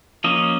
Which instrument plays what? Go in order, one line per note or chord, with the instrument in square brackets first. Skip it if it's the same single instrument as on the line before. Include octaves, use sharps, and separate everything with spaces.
[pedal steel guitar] F3 A#3 C#4 D#5